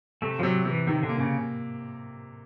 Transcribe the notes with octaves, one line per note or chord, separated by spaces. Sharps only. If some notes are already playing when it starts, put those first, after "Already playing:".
C3 A3
F3
C3 F#3
C3 E3
C3 D#3
D3
A#3
C#3